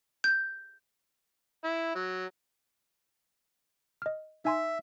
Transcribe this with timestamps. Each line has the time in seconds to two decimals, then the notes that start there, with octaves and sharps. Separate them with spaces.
0.24 G6
1.64 E4
1.95 F#3
4.02 D#5 F6
4.45 D#4 E5 G#5 C6